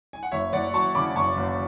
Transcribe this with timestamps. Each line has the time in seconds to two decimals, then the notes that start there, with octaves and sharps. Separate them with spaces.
0.13 G#5
0.23 F#5
0.32 F#1 C#5 E5
0.53 F#1 D5 F#5
0.73 F#2 A5 C#6
0.95 C#3 B5 D6
1.16 F#1 A5 C#6
1.37 F#1